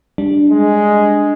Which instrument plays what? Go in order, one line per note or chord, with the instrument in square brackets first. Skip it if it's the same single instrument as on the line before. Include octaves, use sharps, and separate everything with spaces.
[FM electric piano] G3 D4
[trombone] G#3